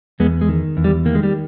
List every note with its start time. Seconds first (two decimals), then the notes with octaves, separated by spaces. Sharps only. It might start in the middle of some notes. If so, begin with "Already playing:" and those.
0.20 E2 G#3 B3
0.41 G#3
0.49 D#3
0.77 E2
0.84 G3
1.05 D#3 A#3
1.15 G#3
1.23 G3